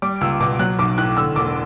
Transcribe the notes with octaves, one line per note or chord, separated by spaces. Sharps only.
G3 D6
C#2 E6
B2 D6
F#3 F#6
B1 D6
A2 F#6
D3 E6
E1 D6